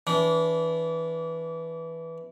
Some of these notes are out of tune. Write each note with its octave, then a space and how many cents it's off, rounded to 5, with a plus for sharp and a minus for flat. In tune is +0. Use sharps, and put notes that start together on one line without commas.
E3 -5 D4 -30